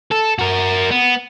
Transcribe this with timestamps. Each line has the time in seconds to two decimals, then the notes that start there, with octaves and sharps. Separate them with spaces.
0.11 A4
0.39 F#4 A#4
0.91 B3